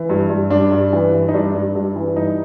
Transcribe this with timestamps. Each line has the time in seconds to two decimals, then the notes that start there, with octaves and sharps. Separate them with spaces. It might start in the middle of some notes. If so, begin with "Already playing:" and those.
Already playing: E3
0.09 G2
0.30 G2
0.50 G2 D4
0.72 G2
0.93 E3
1.12 G2
1.28 D#4
1.34 G2 D4
1.54 G2
1.75 G2
1.96 E3
2.16 G2 D#4